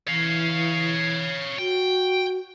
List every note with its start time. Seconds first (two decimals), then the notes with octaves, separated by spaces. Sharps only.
0.07 E3 C#5 F5
1.59 F#4 G5